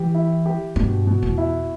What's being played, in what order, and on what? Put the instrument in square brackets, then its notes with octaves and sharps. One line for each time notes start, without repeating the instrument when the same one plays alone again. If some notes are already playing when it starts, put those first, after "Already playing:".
Already playing: [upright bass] E3 [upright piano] G4
[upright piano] E4
G4
[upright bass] G2 [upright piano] B2
[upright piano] B2
[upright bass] E2
[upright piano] E4